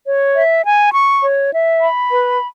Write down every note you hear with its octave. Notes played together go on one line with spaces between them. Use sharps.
C#5
E5
G#5
C#6
C#5
E5
B5
B4